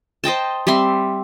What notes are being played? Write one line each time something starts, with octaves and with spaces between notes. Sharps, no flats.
C5 D#5 G5 A5
G3 C4 E5 C6